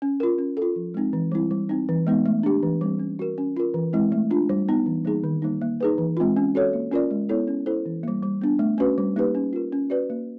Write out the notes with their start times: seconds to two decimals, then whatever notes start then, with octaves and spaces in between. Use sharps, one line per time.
0.02 C#4
0.20 F4 A#4
0.38 C#4
0.57 A4
0.62 F4
0.76 F3
0.94 G#3 C4 D#4
1.13 E3
1.32 G3 C4 E4
1.51 G3
1.69 C4 D#4
1.89 E3
2.07 G#3 B3 D#4
2.26 A3
2.43 D4 G4
2.63 E3
2.81 G3 C4
2.99 C#4
3.19 F#4 A#4
3.38 C#4
3.57 F4 A#4
3.74 E3
3.93 G#3 C4 E4
4.12 A3
4.31 D4 F4
4.49 G3
4.68 B3 D#4
4.86 E3
5.05 G3 A#3 D#4 G#4
5.24 D#3
5.42 G3 A#3 D#4
5.61 A#3
5.81 D#4 G#4 B4
5.98 E3
6.17 G#3 C4 F4
6.37 C#4
6.55 F#4 A4 C#5
6.73 A#3
6.92 C#4 F4 A#4 D5
7.11 G#3
7.29 B3 E4 A4 C#5
7.47 C#4
7.66 E4 A4 C5
7.86 E3
8.03 G3 A#3
8.23 G3
8.42 B3 D4
8.59 A3
8.78 C#4 F#4 B4
8.98 G3
9.16 A#3 D#4 G4 B4
9.35 C#4
9.53 F4 A#4
9.72 C#4
9.90 F#4 B4 D5
10.10 A#3